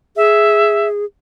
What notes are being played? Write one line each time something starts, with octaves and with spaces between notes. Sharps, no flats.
G#4 E5